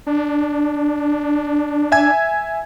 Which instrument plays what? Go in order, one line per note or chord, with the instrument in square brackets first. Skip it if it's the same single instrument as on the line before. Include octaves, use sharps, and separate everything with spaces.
[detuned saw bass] D4
[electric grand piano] E5 G#5 G#6